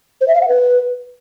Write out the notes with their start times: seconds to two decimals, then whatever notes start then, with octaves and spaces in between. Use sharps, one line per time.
0.21 C5
0.28 E5
0.35 F5
0.41 F#5
0.48 B4